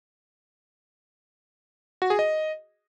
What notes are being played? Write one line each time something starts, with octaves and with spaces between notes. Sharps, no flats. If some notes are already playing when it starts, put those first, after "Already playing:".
F#4
G#4
D#5